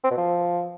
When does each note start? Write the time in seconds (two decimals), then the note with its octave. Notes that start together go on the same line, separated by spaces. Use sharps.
0.04 C4
0.11 B2
0.17 F3